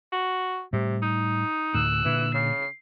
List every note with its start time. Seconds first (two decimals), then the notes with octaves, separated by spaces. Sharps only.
0.12 F#4
0.73 A2 C3 G3
1.02 D#4
1.74 D2 A2 E6 F#6
2.05 A#2 D3 E3
2.34 C#3 C7